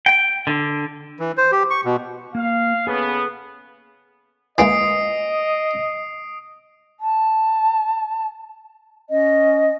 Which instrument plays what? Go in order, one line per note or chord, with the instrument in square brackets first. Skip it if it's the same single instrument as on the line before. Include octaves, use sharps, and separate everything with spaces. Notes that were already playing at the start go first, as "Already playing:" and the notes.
[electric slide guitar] G5
D3
[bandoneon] E3
C5
G4
C#6
B2
[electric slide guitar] A#3 [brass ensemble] F5
[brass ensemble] C#3 B3 [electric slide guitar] G#4 A4 B4
[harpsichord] E3 G#3 A#3 [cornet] D#5 [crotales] D#6 C7 D7
[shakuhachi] A5
[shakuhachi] C#4 [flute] D#5